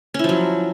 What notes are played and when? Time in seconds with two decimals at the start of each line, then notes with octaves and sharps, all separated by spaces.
0.14 C#4
0.19 E4
0.24 F3
0.29 F#3